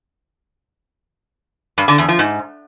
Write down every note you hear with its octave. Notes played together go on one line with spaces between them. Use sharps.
G2
D3
E2
F3
G#2